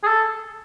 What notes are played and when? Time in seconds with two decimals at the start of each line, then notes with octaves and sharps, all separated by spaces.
0.03 G#4
0.07 A4